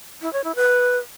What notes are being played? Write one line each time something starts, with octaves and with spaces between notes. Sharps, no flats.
E4
C#5
E4
B4